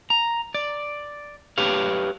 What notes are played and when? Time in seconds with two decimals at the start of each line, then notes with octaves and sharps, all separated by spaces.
0.10 A#5
0.54 D5
1.58 G4 B4 C#5 F5